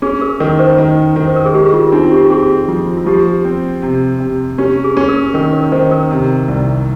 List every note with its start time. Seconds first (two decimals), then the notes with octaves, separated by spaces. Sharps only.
0.02 C#4 G#4
0.21 A#4
0.40 D#3 A#4
0.59 C5
0.78 D#3
1.16 D#3
1.27 C5
1.36 A#4
1.46 G#4
1.54 G#3 G4
1.74 F4
1.87 F4
1.92 C4 D#4
2.03 F4
2.12 G4
2.30 C4 G#4
2.68 F3 F4
2.97 F4
3.06 F3 G4
3.45 C4
3.82 C3
4.20 C3
4.58 C#4 G4
4.84 G#4
4.97 C#4
5.08 A#4
5.34 D#3 A#4
5.53 A#4 C#5
5.72 D#3 C5
5.91 A#4
6.11 C3
6.48 C2